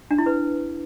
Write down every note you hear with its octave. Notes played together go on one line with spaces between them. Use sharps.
D4
E4
B4